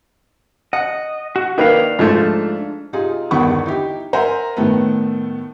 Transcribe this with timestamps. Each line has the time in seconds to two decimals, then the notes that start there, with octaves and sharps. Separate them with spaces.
0.73 D#5 F#5
1.36 F#4
1.58 D#3 A#3 D4 B4 F5
1.99 G#2 F3 A3
2.93 C3 D#4 F4 G#4
3.31 G1 E2 D3 D#3 B5 C#6
3.66 D#4 E4 G4
4.13 A#4 C5 E5 F#5 G#5 A#5
4.57 A2 D#3 A3 B3